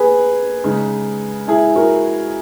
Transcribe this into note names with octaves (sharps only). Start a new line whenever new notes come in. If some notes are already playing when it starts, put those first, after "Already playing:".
Already playing: A#3 G#4 B4
C#3 G#3 D#4
E4 G#4
F#4 A#4